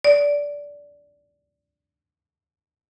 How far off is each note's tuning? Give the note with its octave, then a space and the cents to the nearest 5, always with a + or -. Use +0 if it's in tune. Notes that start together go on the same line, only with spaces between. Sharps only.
D5 -15